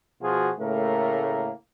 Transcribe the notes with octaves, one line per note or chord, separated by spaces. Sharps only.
B2 F3 F4 F#4 G#4
A2 C#3 A3 A#3 A#4